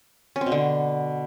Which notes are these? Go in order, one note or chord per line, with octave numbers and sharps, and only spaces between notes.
C#4
C4
B2
D3